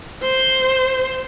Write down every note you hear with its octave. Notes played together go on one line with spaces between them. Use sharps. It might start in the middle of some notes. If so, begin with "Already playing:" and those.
C5